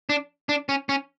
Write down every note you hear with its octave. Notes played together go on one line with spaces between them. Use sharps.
D4
D4
C#4
C#4